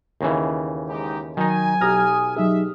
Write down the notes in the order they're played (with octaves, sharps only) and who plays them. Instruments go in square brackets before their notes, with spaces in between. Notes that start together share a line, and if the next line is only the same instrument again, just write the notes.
[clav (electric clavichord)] D#2 C#3 E3
[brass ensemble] G#2 D#4 G4
[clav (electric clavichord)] D#3 D#4 [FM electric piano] F#3 [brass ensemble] G#5
[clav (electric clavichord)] B1 A#5 [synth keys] G4 D#6 F6
[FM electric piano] F#3 D#4 G#4 [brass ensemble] E5